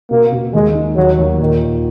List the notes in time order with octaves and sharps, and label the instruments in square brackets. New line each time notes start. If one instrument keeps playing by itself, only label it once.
[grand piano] B2 [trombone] A#3
[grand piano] B2
[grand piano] D#2 [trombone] G#3
[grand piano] D#4
[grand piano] D#2 [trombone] F#3
[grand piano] D#2
[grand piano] A#2 [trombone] D#3
[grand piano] A#2